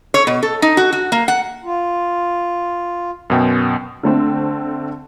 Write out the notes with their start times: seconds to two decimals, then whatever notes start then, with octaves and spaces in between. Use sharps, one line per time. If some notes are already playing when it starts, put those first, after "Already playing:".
0.14 C#5
0.27 B2
0.43 A4
0.62 D#4
0.77 F#4
0.93 F#4
1.12 A#3
1.28 F#5
1.64 F4
3.30 F#2 B2 G5
4.03 D3 A3 C4